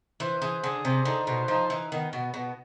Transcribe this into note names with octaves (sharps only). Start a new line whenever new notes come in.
E3 C5
E3 G#4
D3 G#4
C3 C5
D3 D#4
B2 C5
F3 D#4
E3 D#4
D#3 B3
B2 B3
B2 B3